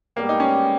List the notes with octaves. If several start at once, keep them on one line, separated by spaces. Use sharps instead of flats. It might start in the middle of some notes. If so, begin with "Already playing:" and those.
G#2 G3 A#3 B3 G4
D#4
C#4